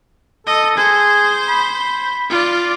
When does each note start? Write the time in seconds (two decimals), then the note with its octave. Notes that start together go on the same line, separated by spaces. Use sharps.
0.47 A4 D#5
0.77 G#4 C5
1.48 B5
2.30 F4 D5